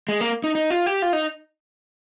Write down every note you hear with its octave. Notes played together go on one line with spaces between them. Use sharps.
G#3
A#3
D#4
D#4
F4
G4
F4
D#4